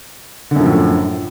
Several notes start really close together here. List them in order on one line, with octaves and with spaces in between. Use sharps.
D3 F#2 F3 A2